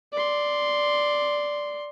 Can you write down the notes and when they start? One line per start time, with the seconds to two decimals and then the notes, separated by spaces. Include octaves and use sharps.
0.13 D5 C6